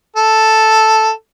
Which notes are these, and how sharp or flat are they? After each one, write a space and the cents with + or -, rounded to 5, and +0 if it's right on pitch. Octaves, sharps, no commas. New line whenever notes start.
A4 +0